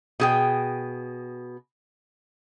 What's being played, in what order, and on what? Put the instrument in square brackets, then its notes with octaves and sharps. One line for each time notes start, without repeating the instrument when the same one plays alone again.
[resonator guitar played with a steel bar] B2 G#4 G5